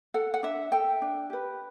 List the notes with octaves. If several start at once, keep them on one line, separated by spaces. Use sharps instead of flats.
A4 F#5
F#5
D4 E5
A4 G5
D4
G4 B4